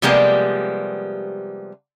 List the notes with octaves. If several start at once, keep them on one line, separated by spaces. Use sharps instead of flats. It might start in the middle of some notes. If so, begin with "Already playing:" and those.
C3 F3 G3 G#3 A#3 B3